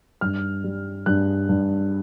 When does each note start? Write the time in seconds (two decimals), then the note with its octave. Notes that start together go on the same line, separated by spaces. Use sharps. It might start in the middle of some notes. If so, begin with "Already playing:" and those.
0.21 G2 F6
0.64 G3
1.06 G2 F#6
1.49 G2